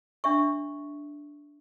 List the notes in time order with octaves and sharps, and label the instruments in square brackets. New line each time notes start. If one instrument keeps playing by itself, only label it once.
[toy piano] D4 E5 C#6